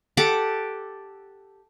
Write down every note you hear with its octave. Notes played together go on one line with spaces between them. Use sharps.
G4 A4 F#5 D6